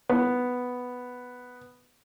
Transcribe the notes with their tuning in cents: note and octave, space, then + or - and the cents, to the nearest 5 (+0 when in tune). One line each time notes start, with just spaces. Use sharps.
B3 +5